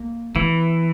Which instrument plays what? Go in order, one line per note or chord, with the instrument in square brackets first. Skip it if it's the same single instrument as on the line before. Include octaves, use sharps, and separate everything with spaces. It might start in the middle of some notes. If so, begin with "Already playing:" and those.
Already playing: [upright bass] A#3
[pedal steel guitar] E3 [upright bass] B3